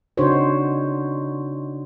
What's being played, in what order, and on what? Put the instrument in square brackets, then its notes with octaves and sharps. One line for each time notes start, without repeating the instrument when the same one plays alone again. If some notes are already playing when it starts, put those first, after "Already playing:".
[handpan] C#3 D4 D#4 F#4 C5 C#5